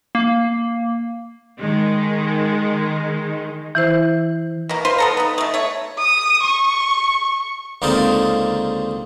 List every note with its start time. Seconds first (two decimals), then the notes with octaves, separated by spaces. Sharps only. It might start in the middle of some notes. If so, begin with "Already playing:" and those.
0.15 A#3
1.58 D#3 G#3
3.75 E3 E4 C5
4.69 B2 A#3
4.85 F4 B4 C5 C6
4.98 B3 A4 A#5
5.17 B3 D#4
5.38 B2 A3
5.54 A3 C#5
5.98 D#6
6.44 C#6
7.82 C#2 D3 A#3 C4 D#4 A5